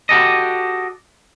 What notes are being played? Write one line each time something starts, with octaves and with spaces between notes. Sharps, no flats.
F#4 G4 A4 D#5